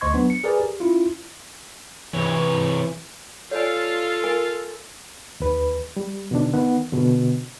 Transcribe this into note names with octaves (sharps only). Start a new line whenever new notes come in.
D2 C5 D#5 C6 C#6 G#6
F#3 B3 D4
C#7
G#4 A#4 B4 D5 G#5
G4
C#4 E4 F4
C3 E3 C#5
F4 A4 C#5 D5 F5 G#5
A#4 G#5
D#2 B4
G3
B2 D3 D#3 D4
D#3 B3 F#5
B2 D3